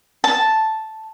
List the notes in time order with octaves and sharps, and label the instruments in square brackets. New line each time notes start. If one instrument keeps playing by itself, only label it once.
[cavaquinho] A5